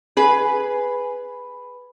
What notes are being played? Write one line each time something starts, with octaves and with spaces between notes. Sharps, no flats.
G#4 B4